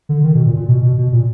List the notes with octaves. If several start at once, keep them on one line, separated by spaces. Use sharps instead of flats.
D3
D#3
B2
A#2
A#2
B2
B2
B2
A#2